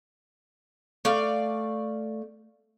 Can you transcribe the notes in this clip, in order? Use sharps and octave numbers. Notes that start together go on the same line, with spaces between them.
A3 D5 F5